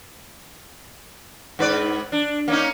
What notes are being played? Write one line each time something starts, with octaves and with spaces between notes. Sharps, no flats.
G#2 B4 D5
D4
A#3 C#4 D#4